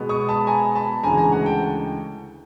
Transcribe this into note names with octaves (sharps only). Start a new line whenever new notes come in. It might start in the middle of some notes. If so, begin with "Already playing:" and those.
Already playing: B2 G#3 B3
C#6 D#6
A5 B5
G#5 A#5
A5 B5
D2 C#3 E3 G#3 G#5 A#5
G#5 A#5
F#5 G#5
G5 A5